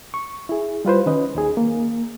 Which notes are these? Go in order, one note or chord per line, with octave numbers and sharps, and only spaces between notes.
C#6
E4 G#4
G3 F4 B4 C5
D#3 C#4 B4 D#5
D#2 D#4 G#4
A#3